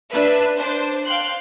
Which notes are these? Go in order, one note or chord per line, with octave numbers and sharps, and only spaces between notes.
D4 B4 E5
D4 C5
F5 G5 C6 F#6